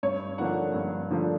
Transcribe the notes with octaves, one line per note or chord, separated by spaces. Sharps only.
G2 C#5
D3 F3 A#3 D4 F#5
G2
D3 F3 A#3 D4